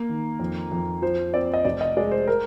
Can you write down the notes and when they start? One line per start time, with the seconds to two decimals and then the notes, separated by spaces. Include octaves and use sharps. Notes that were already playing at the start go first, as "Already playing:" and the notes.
Already playing: A#3
0.09 D#3
0.39 F2
0.71 F2
1.02 F3 C5
1.34 C4 D5
1.54 D#5
1.65 F1 D5
1.81 D#5
1.97 G#3 D5
2.11 C5
2.28 A#4